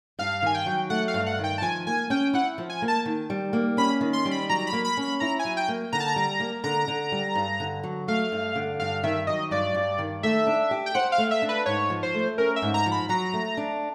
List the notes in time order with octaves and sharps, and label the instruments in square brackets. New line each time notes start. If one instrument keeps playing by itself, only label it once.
[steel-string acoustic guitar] G2 [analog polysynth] F5
[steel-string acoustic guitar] D#3 [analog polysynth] G#5
[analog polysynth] G5
[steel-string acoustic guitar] F#3
[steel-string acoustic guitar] A3 [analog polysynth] F#5
[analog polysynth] F5
[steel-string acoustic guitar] G2
[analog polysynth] F#5
[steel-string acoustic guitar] D#3
[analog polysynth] G5
A5
[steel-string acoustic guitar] F3 [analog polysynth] G#5
[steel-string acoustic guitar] A#3 [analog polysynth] G#5
[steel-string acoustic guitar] C#4 [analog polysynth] G5
[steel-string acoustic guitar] E4 [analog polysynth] F#5
[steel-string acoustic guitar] F3
[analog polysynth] G#5
[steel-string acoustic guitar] A#3
[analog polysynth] A5
[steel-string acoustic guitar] D#3
G3
A#3
[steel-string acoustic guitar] C#4 [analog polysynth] B5
[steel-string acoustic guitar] D#3
[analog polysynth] C6
[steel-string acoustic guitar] G3
[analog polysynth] B5
[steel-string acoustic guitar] F#3 [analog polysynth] A#5
[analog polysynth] B5
[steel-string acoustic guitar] A#3
[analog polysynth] B5
[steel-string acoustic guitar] C#4 [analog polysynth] B5
[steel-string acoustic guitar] E4 [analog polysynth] A#5
[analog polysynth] G#5
[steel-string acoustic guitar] F#3
[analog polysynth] G5
[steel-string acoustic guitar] A#3
[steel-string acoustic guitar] D3 [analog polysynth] A#5
[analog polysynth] A5
A#5
[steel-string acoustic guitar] G3
A#3
[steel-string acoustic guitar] D3 [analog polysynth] A#5
[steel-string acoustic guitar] D3
G3
G2
D3
F#3
[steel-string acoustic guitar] A3 [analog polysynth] F5
[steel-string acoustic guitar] G2
D3
[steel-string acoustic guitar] G2 [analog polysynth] F5
[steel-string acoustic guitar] D#3 [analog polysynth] E5
[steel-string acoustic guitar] F#3 [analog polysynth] D#5
[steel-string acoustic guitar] G2 [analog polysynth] D5
[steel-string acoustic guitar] G2
D#3
[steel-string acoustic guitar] A3 [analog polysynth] E5
[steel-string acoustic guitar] D4
G4
[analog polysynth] G5
[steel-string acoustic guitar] C5 [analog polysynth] F#5
[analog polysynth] F5
[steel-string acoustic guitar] A3
[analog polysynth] E5
[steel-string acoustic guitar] D4
[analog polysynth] B4
[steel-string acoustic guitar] G#2 [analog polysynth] C#5
[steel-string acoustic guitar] F3
[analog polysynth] C5
[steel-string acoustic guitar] A3
[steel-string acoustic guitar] C#4 [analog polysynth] A#4
[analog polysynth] E5
[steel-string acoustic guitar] G#2
[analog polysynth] A#5
[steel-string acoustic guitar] F3
[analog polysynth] B5
[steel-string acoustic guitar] F#3 [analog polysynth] A#5
[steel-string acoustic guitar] A3
D4